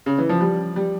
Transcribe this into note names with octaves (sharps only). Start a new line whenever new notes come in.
C#3
E3
F3
G3
G3